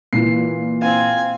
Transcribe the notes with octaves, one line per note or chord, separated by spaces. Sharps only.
A#2 E3 C7
C4 F5 G#5